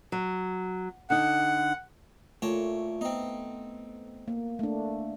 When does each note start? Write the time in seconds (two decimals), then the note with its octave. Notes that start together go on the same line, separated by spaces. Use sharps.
0.12 F#3
1.10 D3 D#4 F#5
2.42 A#2 A3 C#5 A5
3.01 B3 C4 D#4
4.28 A#3
4.59 A3 D4